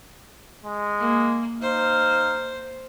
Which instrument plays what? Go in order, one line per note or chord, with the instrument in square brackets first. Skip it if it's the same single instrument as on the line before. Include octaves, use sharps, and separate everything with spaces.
[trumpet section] G#3
[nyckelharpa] A#3
[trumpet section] D#4 F5 [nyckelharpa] C5